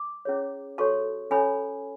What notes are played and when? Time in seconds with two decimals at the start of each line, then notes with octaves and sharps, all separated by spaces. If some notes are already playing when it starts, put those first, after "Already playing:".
Already playing: D6
0.25 C#4 E4 G#4 C#5
0.78 F#4 A4 C#5 A5 C#6
1.31 C#4 E4 A4 C#5 G#5 B5